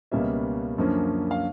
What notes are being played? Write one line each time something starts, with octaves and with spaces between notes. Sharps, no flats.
C#2 B2 G3 A#3 C#4 E5
F#2 D3 F3 A#3 C#4
F5